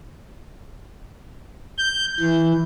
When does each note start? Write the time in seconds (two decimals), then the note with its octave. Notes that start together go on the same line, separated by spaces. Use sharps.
1.78 G6
2.20 E3